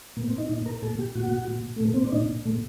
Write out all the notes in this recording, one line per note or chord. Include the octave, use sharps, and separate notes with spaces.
A#2 A#3
C4
D#4
A#2 D#4
A#4
A#2 A4
G4
A#2 F#4
A#2
A3
A#2 A#3
C4
D4
A#2 D#4
A#2 A3